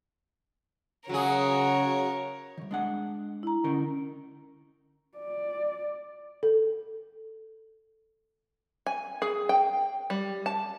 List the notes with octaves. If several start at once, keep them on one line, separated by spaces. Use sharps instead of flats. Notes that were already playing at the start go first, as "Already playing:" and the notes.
C#3 F#3 F#4 G#4 A#4 C#5
C2 D#3
G#3 D4 F#5
E4 A#5
D3 C#4 D#4 A#4
D5
A4
G#5
G#4
G5
G3
A5